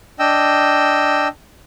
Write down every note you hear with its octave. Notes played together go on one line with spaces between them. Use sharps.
D4 D#5 G5 E6